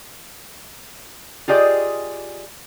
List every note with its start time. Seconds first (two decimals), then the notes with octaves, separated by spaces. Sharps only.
1.48 F4 G4 G#4 D5 D#5